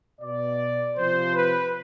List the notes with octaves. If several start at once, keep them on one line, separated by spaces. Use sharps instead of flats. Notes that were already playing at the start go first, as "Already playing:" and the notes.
B2 D5
C3 F3 C5
B4